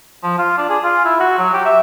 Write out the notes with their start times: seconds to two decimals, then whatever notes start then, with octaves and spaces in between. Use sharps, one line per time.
0.23 F3
0.38 F4
0.58 D4
0.69 G#4
0.83 F4
1.05 E4
1.20 F#4
1.38 F#3
1.53 G4
1.65 E5